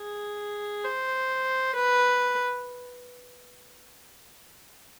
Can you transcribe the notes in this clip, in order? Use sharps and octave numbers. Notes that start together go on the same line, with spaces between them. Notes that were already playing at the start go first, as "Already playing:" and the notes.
Already playing: G#4
C5
B4